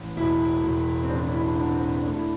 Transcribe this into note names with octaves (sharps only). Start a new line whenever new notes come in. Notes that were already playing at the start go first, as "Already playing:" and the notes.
Already playing: A1
E1 E4
E1
C4
A1 D4
E4
D4
D3
C4
A3 D4
E4